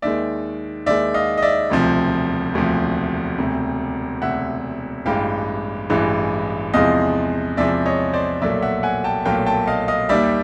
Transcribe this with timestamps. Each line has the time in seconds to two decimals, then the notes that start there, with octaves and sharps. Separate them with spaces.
0.02 D#2 D#3 G#3 D5 E5
0.86 D#2 D#3 G#3 D5 E5
1.14 D#5 F5
1.38 D#5
1.42 D5 E5
1.70 E1 D2 C3 F3
2.54 E1 D2 C3 F3
3.38 E1 D2 C3
4.22 E1 D2 C3 E5 F#5
5.06 A1 G2 E3 G#3 F5 G5
5.90 A1 G2 E3 G#3
6.74 E2 C3 F3 G#3 D#5 F5
7.57 E2 C3 F3 G#3 D5 E5
7.86 C#5 D#5
8.13 C5 D5
8.42 B1 A#2 F#3 A3 D5 E5
8.62 E5 F#5
8.83 F#5 G#5
9.04 G5 A5
9.25 B1 A#2 F#3 A3 F5 G5
9.46 G5 A5
9.67 D#5 F5
9.88 D#5 F5
10.09 D#2 D#3 G3 D5 E5